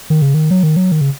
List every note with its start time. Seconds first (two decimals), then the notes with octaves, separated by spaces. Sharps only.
0.10 D#3
0.22 C#3
0.34 D#3
0.51 F#3
0.63 D#3
0.77 F#3
0.92 D#3
1.01 C#3